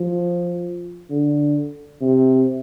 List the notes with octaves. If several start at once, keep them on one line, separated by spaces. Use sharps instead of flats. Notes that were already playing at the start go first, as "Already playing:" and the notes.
Already playing: F3
D3
C3